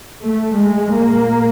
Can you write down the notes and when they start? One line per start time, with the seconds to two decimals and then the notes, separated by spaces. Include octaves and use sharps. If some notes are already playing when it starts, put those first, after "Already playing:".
0.23 A3
0.58 G#3
0.94 A#2 A#3